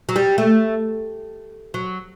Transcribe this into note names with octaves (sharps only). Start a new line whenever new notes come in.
F#3
G3
A3
F#3